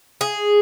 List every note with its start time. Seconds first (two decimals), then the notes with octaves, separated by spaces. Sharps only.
0.21 G#4